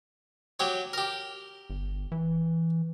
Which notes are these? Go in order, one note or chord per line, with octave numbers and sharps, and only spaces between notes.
F#3 G4 C#5
G4 A#4
G1
E3